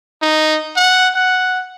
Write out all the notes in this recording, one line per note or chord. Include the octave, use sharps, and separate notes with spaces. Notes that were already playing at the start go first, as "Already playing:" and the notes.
D#4
F#5
F#5